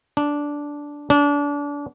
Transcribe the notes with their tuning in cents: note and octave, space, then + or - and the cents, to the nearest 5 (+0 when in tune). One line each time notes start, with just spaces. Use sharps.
D4 -10
D4 -30